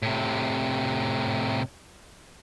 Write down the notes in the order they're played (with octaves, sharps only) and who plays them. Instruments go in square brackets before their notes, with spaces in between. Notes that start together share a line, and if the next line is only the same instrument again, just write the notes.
[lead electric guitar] A2 C3